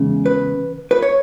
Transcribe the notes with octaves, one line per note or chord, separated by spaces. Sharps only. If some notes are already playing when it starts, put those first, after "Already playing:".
Already playing: E2 C#3 G#3
B4
B4
C#5